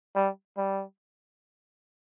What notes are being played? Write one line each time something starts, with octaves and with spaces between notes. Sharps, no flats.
G3
G3